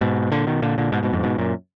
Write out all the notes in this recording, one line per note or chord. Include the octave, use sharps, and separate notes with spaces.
G#2 B2
A#2 D3
B2 D#3
A#2 D3
A#2 D3
G#2 B2
G#2 B2
F2 G#2
G#2 B2
F#2 A#2